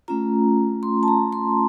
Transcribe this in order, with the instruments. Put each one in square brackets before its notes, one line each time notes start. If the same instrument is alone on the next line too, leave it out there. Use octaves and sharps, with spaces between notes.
[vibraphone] A3 C#4 F4 A#5
C6
A5
A#5
C6